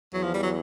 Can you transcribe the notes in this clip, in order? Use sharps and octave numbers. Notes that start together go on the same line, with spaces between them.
E2 F#3
F3
G3
F#3